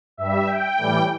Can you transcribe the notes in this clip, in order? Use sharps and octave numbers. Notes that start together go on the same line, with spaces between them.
G2 G3 E5
G5
A2 E3 G3